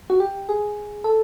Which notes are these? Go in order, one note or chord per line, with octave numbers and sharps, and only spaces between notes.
F#4
G4
G#4
A4